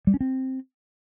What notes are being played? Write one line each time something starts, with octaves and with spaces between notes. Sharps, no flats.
G3
C#4
C4